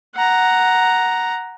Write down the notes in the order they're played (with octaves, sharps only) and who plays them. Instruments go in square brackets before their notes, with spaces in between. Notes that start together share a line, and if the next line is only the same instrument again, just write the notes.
[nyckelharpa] F#5 A#5